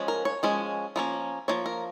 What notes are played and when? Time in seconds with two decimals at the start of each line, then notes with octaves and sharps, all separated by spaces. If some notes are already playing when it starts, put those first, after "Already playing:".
Already playing: F3 G#3 C#4
0.08 A#4
0.25 C#5
0.43 F3 G#3 C#4
0.96 F3 A#3 C#4
1.48 F3 A#3 C#5
1.66 A#4